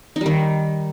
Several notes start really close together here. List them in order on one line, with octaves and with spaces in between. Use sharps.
D#4 G3 D#3